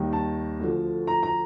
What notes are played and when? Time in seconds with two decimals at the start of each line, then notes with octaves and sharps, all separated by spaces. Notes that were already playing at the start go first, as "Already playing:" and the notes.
Already playing: D#2 D#3 G3
0.13 A5
0.59 D2 D3 F3
1.07 A#5
1.23 A#5